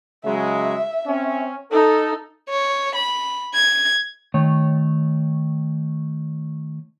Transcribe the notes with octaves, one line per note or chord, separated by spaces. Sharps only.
C#3 F#3 G#3 E5
C4 C#4
D#4 A4
C#5
B5
G#6
D#3 A3 C#5